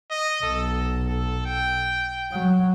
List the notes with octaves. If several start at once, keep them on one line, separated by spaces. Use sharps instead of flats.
D#5
B1 A4
A4
G5
F#3